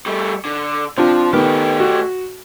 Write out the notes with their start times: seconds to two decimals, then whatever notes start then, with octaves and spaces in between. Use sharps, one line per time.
0.06 G3 A3
0.45 D3
0.98 F3 C4 D4 F4
1.33 D#3 A3 B3 G4 F6
1.80 F#4